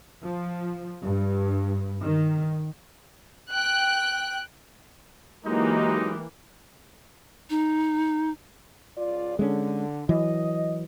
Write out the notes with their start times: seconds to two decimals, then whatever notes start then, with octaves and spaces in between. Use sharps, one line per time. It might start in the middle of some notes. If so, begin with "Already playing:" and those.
0.24 F3
1.02 G2
2.01 D#3
3.53 G5 F#6
5.46 E3 F#3 G#3 A#3 D#4 G4
7.50 D#4
8.97 C#2 F4 D5
9.39 D3 G#3 C#4
10.09 E3 F#3 D#5